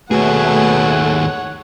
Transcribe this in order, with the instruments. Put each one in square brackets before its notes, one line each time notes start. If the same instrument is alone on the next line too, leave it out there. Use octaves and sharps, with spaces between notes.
[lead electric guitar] D#2 G#4 [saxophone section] B2 [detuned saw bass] A3 [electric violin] C#5 F#5